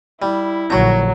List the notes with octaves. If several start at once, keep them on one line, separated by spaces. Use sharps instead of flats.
G3 E4
A#1 D3 F#3 F#4 A#5